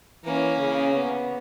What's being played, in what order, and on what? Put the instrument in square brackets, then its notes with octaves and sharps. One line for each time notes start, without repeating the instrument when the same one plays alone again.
[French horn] E3 [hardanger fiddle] A#3 C#4
[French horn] C#3
B3